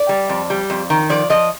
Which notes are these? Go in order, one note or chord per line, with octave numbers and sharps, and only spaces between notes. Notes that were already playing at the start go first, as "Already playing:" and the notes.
Already playing: D5
G3
F2
G3
F2
D#3
F3 D5
F3 D#5